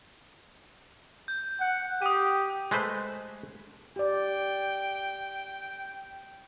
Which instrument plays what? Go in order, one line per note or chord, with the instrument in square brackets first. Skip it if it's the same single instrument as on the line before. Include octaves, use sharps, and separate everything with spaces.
[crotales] G6
[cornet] F#5
[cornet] G4 [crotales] D#6 D#7
[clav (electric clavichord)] G#3 A3 B4 C5
[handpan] G4 D5 [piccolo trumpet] G5